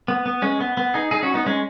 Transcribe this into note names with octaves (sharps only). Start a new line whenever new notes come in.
B3
B3
G#3 C#4
B3
B3
D#4 G#4
D#4 G#4
C#4 F#4
B3 D#4
G#3 C#4